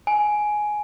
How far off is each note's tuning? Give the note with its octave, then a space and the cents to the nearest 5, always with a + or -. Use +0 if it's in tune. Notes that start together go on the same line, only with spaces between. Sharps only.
G#5 +10